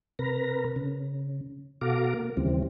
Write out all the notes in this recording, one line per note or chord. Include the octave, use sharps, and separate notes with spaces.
C3 A#4 B4 A#5
C#3
B2 F#4 A4 F5 A#5 D6
A#3
D#2 C#3 E3 G3 C4